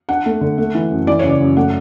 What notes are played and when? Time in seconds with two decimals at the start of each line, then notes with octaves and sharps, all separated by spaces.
0.09 D4 F#5
0.26 A3
0.41 D3
0.58 A3
0.75 E3
0.90 F#2
1.07 E3 D5
1.19 C#3 C#5
1.30 D5
1.41 F#2
1.57 A3 F#5